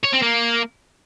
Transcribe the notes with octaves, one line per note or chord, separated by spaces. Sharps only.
C#5
C4
A#3